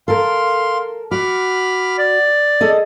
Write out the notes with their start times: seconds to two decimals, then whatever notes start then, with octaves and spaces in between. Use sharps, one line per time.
0.08 A4 A#4 F5 C6
1.11 F#4 B5 D6 F6
1.98 D5
2.61 G#4 A4 D#5